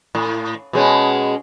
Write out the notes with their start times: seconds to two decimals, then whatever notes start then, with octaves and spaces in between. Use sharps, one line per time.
0.15 A2
0.73 B2 G#3 C#4